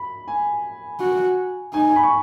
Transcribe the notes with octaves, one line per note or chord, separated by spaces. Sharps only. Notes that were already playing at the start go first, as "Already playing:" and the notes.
Already playing: B5
G#5
F#4
D#4 G#5
G#5
B5
C#6